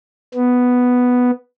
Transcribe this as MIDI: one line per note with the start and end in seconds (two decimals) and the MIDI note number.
0.34 1.31 59